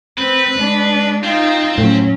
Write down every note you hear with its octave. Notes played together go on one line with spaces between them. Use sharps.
C4 B4
G#3 D4
C4 D#4 F4
A2 F#3 C#4